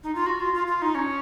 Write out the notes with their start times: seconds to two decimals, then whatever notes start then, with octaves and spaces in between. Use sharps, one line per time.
0.03 D#4
0.15 F4
0.26 F#4
0.40 F4
0.54 F4
0.67 F4
0.82 D#4
0.95 C#4